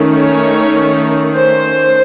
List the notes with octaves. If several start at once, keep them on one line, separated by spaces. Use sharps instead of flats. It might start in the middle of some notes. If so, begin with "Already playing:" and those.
Already playing: D#3 A3 C#4
C#5
C5